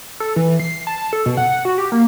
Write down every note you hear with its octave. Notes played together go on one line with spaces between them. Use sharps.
A4
E3
C7
A5
A4
B2
F#5
F#4
G4
A#3